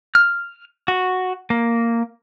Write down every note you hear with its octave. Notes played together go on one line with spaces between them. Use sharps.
F6
F#4
A#3